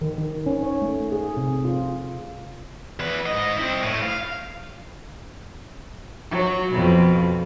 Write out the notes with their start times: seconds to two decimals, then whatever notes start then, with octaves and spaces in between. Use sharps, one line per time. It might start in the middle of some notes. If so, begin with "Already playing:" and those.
0.01 D#3
0.18 D#3
0.46 C#4
0.63 C#5
0.82 A3
1.12 G#4
1.37 C3
1.65 F4
3.00 E2 B4
3.26 G#2 D#5
3.57 C4 E4
3.83 A2
4.02 F5
6.30 F#3
6.72 F2 B2